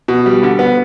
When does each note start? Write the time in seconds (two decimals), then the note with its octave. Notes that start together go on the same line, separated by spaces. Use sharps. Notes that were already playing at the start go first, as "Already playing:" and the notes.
0.08 B2
0.26 G3
0.43 D3
0.59 B3